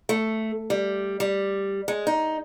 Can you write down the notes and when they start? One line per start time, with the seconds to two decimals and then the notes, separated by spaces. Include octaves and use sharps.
0.09 A3
0.70 G3
1.20 G3
1.88 G#3
2.07 D#4